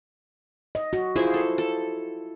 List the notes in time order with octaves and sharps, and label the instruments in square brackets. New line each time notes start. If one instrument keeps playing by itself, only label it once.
[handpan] D#5
F#4
[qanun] E4 G#4 C5 [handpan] F4
[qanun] A4
A4